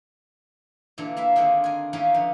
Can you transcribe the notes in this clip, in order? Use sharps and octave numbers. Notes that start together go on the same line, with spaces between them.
A#2 D3 E3 D4
A#3 E4 E5
D3 D#3 G#3 A#3 C4 D4
A#4 G#5
D#3 E3 A#3 B3 C#4 D#4
D3 F3